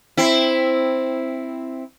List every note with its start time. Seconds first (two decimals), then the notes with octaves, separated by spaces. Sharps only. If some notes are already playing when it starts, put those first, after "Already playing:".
0.17 C4 E4